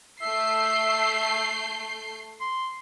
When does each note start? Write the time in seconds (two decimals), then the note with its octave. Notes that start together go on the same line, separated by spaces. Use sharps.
0.21 A3 E5 G6 C7
2.40 C6